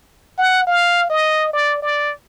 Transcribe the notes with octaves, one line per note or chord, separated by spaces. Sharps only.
F#5
F5
D#5
D5
D5